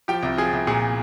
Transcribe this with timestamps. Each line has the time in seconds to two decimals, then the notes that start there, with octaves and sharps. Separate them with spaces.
0.08 F3 G4 G5
0.23 C2
0.37 F3 G#4
0.53 C2
0.67 A#2 G#4